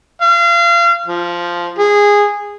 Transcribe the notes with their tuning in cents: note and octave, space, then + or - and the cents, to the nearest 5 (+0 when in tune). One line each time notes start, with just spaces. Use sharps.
F5 -30
F3 -5
G#4 -15